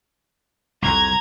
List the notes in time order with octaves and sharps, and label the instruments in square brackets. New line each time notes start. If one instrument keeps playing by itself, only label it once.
[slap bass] C2 F2 [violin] A#5 G#6